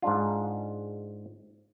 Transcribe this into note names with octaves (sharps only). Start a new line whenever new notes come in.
G#2 G#3 D4 F4